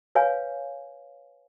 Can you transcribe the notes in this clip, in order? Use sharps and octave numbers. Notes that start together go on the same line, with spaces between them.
B4 C#5 F5 G#5